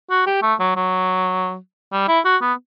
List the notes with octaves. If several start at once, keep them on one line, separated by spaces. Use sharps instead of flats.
F#4
G4
A3
F#3
F#3
G3
E4
F#4
B3